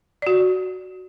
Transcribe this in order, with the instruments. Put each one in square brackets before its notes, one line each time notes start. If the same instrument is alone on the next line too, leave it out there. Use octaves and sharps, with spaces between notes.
[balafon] F#4 D5